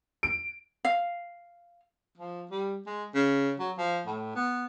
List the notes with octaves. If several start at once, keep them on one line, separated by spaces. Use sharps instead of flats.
D7
F5
F3
G3
G#3
C#3
F#3
F3
A2
B3